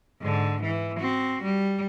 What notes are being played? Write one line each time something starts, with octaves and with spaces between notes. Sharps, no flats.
G#2 D3
E3
C4 F#4
G3